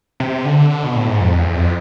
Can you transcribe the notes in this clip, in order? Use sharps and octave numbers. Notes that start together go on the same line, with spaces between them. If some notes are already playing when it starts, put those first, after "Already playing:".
C3
D3
D3
B2
A2
G#2
F2
E2
F2